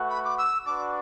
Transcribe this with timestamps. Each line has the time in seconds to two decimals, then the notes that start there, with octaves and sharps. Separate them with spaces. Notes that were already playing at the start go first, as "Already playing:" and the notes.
Already playing: A3 F#4 B4 F#5
0.10 B5
0.24 D6
0.38 E6
0.66 D4 F#4 B4 D5 D6